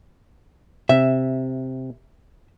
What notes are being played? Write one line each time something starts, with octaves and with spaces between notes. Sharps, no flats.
C3 E5